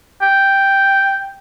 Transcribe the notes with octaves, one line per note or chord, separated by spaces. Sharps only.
G5